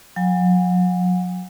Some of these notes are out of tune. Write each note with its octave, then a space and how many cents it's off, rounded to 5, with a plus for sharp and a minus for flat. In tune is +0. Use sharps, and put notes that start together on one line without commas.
F#3 -40 G#5 -45